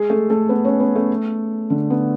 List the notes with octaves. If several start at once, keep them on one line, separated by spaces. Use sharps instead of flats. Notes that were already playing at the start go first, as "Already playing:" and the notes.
Already playing: G#3 G#4
A3 A4
A3 A4
B3 B4
C#4 C#5
B3 B4
A3 A4
D3 D4
B3